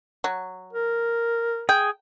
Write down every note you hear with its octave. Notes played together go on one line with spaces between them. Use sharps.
F#3
A#4
G#4 G5